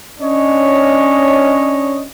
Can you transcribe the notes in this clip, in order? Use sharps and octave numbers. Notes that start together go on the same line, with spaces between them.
C#4 D4 C#5 D#5